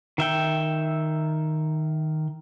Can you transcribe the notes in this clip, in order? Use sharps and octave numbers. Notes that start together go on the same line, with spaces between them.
D#3 E5 G5